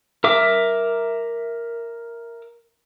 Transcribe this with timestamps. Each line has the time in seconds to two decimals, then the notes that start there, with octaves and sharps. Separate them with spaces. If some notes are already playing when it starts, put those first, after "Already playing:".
0.24 A#4 E5 D6